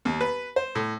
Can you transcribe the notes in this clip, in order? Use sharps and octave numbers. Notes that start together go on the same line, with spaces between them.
D#2
B4
C5
A2